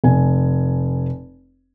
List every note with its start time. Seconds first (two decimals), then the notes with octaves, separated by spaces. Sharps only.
0.04 F1 G#5